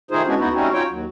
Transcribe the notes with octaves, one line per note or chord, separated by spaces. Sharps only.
D#3 A3 D#4 F4 G#4 C5
G#3 B3 C#4 D4 E4 F#4
D2 B3 D#4 E4 F#4
G3 A3 C4 C#4 D#4 F#4
C#4 D#4 F4 F#4 C#5 G5
D#2 F#3